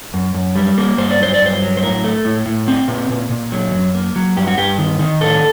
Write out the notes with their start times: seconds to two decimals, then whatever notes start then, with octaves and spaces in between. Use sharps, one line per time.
0.14 F#2
0.34 F#2
0.56 G3
0.78 A#3
0.98 G2 C5
1.10 D5
1.20 F#3 C5
1.34 D5
1.41 G2 C5
1.62 F#3
1.77 C5
1.82 A2 A#4
2.04 A3
2.25 A2
2.46 A2
2.68 C4
2.88 A#2
3.09 A#2
3.30 A#2
3.52 F#3
3.73 F#2
3.95 A#3
4.16 F#3
4.37 G2 G4
4.47 F#4
4.58 G2 G4
4.78 D#3
4.99 D#3
5.21 A2 A4